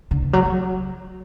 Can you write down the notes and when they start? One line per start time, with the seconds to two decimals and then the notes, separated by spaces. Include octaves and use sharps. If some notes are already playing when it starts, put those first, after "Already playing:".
0.11 D3
0.22 E3
0.33 F#3
0.45 F#3